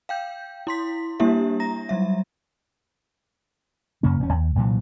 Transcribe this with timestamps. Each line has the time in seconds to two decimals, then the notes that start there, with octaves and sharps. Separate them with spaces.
0.09 F5 G5 G6
0.67 E4 C6 B6
1.20 G3 A#3 D4 E4 G4 E5
1.60 A#5 A#6
1.89 F#3 G3 E5
4.03 F#2 C#3 A#3 C#4
4.20 E1 C#4
4.33 D#2
4.55 C2 A#2 E3 F#3